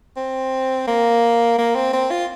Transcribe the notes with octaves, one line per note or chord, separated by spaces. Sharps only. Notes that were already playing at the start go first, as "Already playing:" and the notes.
C4
A#3
A#3
C4
C4
F4